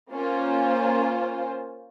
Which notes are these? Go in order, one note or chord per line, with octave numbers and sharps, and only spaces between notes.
A#3 C#4 F4 C5